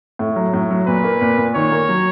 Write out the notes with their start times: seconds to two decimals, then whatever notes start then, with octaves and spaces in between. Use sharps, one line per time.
0.19 A2
0.36 F#3
0.53 A2
0.71 F#3
0.87 A#2 B4
1.04 A#3
1.21 A#2
1.38 A#2
1.54 D#3 C#5
1.72 A#3
1.89 F#3